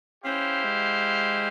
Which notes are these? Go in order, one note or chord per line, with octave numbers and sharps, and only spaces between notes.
C#4 E4 G4 C5 F5
G#3